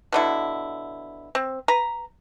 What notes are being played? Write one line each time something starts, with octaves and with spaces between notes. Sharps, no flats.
B2 D3 E4
C4
B4 A#5